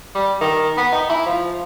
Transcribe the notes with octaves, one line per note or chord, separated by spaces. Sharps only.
G3
D#3
B3
D#4
E4
F3